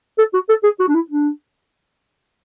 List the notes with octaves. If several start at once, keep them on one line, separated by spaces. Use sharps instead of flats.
A4
F#4
A4
G#4
F#4
D4
E4
D4